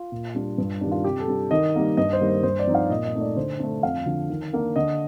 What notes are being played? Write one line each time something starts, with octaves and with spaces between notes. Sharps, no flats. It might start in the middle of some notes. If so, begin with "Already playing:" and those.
Already playing: F4
A#2
G3 D4
G2
D#3 G3 D4
F4
C3 G4
A4
G3 D4
D#3 D#5
G3 A#3 D#4
G2 D#5
C5
D#3 G3 A#3
C5
G2 C5
D5
F3 C4 D#4
F5
A#2 D#5
D#5
A3 C4 D#4
D5
D3 C5
A3 D4
F2 F5
D3 F3
D#3
A#3 D4
D3 D#5